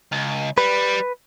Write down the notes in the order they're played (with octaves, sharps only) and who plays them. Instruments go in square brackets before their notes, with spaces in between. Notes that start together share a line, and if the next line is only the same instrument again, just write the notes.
[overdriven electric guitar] C#2
[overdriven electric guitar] G3 [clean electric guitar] B4